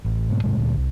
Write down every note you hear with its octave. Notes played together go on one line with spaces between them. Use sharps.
A1
G#2 B2
G#2 C3 G#3
D2 A#2
C2